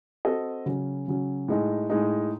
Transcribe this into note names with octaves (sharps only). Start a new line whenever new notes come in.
C4 F#4 A4 D#5
C#3 F#3 C#4
C#3 F#3 C#4
A2 G#3 D#4
A2 G#3 D#4